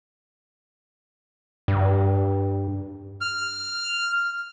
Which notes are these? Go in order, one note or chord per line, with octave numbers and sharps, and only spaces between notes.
G2
F6